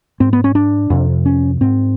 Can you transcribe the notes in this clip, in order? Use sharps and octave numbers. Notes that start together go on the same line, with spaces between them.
G#2 C4
B3
C#4
D4
F2 C3
C#4
G#2 C4